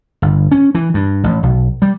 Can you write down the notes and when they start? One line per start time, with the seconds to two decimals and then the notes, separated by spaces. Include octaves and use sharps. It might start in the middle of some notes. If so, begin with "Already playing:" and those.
0.22 G1
0.51 C#4
0.75 E3
0.94 G2
1.24 A1
1.43 B1
1.82 G3